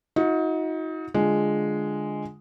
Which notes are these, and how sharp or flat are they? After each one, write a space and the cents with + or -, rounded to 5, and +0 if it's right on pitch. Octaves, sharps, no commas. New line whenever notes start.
D#4 +30 F#4 -35
D3 +0 G#3 +0 F4 +0